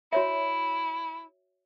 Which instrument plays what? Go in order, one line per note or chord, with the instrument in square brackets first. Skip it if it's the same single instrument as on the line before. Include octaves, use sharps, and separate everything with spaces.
[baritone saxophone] E4 [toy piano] F#4 C#5 E5